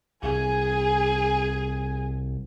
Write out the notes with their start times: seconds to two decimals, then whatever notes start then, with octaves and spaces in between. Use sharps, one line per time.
0.23 C2 G#4 G#5